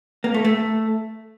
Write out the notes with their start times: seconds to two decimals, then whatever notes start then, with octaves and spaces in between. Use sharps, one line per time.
0.24 A#3
0.34 A3
0.45 A3